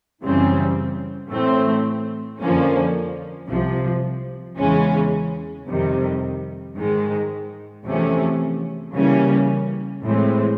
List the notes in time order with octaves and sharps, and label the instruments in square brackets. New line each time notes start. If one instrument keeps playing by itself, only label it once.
[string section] F#2 C#3 E3 G3 C4
A2 E3 A3 C4
F2 D3 F3 A#3 C#4
C2 C3 F3
E2 C#3 E3 G#3 C#4
F2 C3 D#3 G3
G#2 D#3 G#3
E2 C3 F3 A3 C#4
C#3 E3 G3 A#3 C#4
A2 E3 G#3 C4